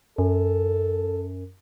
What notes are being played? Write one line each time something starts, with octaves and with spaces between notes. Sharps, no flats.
F#2 A4